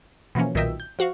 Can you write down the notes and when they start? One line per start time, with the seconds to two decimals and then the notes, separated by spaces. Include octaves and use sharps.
0.35 B2 E3 F3 A#3 C#4
0.55 B1 A#2 D#3 D#5 E5 G5
0.80 G6
0.99 F3 F#4 F5 C#6